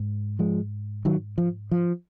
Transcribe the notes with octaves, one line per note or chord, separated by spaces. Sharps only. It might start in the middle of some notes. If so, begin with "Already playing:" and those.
Already playing: G#2
F3 G#3
D#3 F#3
F3
F3